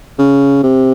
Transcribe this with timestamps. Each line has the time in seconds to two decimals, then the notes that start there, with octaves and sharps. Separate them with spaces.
0.18 C#3
0.63 C3